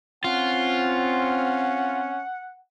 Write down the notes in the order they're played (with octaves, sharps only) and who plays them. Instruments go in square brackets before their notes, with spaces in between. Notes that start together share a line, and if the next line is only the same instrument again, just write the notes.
[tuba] C4 [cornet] C#4 [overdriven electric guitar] F4 [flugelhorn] F#5